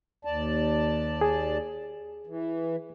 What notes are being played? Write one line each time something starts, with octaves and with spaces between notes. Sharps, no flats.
D#2 D5 A5
G#4
E3